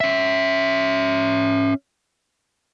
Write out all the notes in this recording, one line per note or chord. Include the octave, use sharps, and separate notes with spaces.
C#4 E5